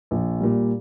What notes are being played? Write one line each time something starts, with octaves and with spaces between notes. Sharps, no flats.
A#1
A#2 G3